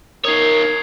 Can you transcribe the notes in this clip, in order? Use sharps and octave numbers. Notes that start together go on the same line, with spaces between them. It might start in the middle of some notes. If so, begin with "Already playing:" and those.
D#4 A#4 C#5 D#6 G#6 C7